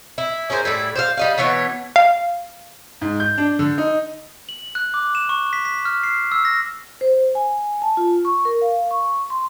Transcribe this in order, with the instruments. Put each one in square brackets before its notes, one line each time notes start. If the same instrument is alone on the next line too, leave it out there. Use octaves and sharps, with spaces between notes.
[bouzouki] E4
C#4 G#4 A#4 C5
A2 G3 E4
C5 D5 F5
G3 D#5 F5
B2 E3 B3 C#5
[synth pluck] F5
[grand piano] G#2
G6
D4
D3
D#4
[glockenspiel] F#7
F#6
D6
E7
C#6
B6
B6
F6
C7
E6
A#6
[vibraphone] C5
G#5
A5
F4
C#6
A#4
F5
C#6
C6